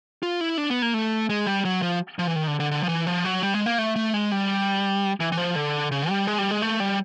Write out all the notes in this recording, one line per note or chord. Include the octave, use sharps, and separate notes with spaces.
F4
E4
D4
B3
A#3
A3
G#3
G3
F#3
F3
F3
E3
D#3
D3
D3
D3
F3
E3
F3
F#3
G3
G#3
A#3
A3
A3
G#3
G3
E3
E3
F3
D3
C#3
G3
G#3
G3
G#3
A3
G3